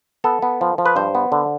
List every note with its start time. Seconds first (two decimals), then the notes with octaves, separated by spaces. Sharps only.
0.24 B3 A4
0.42 B3
0.61 F3
0.78 F3
0.85 B4
0.96 G2 C5
1.15 B3
1.32 D3